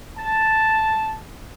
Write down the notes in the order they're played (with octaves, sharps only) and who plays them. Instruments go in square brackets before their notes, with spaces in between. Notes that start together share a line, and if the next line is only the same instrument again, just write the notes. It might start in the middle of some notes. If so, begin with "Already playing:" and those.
[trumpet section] A5